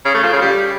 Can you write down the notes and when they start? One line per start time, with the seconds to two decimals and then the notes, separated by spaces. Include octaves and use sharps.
0.05 C#3
0.14 A3
0.23 F3
0.32 C#3
0.42 G3